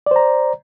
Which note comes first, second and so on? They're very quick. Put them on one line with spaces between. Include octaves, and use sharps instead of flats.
D5 C5 A#5